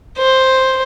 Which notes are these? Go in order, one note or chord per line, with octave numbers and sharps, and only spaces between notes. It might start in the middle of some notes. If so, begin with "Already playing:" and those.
C5